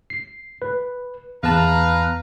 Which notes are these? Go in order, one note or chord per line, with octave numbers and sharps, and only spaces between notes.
C7
B4
E2 B4 F5 A5 A#5